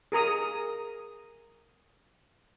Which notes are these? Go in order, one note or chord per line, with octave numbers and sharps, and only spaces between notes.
G#4 A#4 A#5 D#6